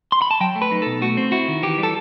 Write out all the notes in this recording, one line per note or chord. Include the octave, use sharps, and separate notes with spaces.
C6
B5
A5
F#3 G5
A3
B4
D#4
B2 A4
A3 F#4
C4
E4 F#4
D#3
E3 G4
G3
A4